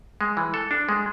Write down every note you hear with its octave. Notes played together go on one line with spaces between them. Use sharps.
G#3
E3
A4
D4
G#3